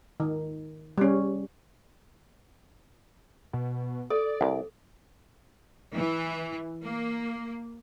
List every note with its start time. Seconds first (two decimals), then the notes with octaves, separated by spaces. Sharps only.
0.20 D#3
0.98 G3 C#4
3.53 B2
4.10 A4 D5
4.41 C2
5.94 E3
6.83 A#3